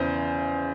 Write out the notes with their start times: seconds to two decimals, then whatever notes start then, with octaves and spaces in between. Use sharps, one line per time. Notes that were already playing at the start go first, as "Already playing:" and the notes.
Already playing: E2 C#3 E3 C5